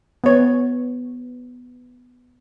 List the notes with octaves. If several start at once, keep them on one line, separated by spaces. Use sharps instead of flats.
B3 C#5